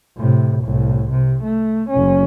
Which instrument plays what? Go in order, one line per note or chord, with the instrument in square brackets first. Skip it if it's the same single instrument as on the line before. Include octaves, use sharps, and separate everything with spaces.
[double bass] A2 C3
C2 A2
C3
A3
F#1 C#4